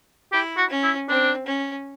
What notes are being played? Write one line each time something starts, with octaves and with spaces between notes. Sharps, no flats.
E4 G4
F#4
C#4
E4
C4 D4
C#4